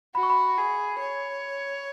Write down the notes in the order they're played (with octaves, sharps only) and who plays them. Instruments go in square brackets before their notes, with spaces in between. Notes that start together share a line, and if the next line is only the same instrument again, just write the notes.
[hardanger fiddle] F#4 [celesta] B5
[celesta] C#6
B5
[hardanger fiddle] G#4
C#5